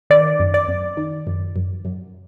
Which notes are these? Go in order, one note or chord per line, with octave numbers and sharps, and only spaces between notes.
D#3 D5
F#2
D5
F#2
D#3
F#2
F#2
F#2